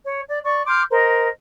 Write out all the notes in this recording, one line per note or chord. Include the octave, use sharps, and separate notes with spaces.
C#5
D5
D5 C#6
C6 D6 F6 G6
A#4 C5 D#5